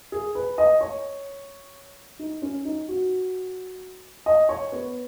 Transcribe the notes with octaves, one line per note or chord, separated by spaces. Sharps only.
G#4
B4
D#5
C#5
D#4
C#4
D#4
F#4
D#5
C#5
B3